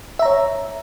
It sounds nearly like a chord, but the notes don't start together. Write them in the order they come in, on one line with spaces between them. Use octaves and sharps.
E5 A#5 C#5